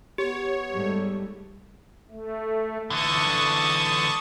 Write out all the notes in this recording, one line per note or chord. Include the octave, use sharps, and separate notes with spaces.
B3 G4 C#5
G#2 G3 A3
A3
D3 E3 A5 C#6 D#6